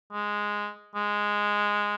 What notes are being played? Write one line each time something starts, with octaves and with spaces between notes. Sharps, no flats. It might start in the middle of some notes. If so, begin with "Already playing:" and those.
G#3
G#3